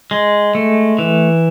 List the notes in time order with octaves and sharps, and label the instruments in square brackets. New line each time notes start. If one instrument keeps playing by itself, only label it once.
[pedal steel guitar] G#3
A3
E3